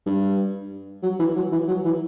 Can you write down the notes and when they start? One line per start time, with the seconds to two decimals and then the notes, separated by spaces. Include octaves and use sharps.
0.06 G2
1.03 F#3
1.20 E3
1.36 F#3
1.52 E3
1.68 F#3
1.85 E3